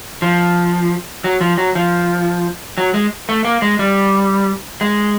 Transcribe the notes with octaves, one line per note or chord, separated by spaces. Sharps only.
F3
F#3
F3
F#3
F3
F#3
G#3
A3
A#3
G#3
G3
G#3